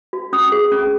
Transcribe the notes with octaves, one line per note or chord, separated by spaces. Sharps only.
F#4
C#4 D#6
G#4
C#4